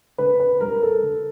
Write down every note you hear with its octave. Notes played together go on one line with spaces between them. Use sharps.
D3 B4
B4
G3 A#4
A4
D3